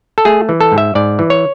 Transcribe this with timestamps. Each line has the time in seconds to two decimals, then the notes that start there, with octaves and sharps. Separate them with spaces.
0.18 A4
0.25 A3 G#4
0.49 E3
0.61 A4
0.72 G#2
0.78 E5
0.95 G#2 D5
1.19 E3
1.30 C#5